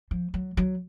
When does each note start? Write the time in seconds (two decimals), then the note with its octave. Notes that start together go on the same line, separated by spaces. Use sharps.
0.11 F3
0.34 F#3
0.57 F#3